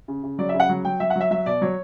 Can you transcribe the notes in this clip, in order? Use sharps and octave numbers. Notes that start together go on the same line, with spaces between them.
C#3
C#3
F#3 D5
E5
C#3
F#5
F#3
F#3 G5
F#3 E5
F#5
F#3 E5
F#3 E5
B2 D5
F#3 C#5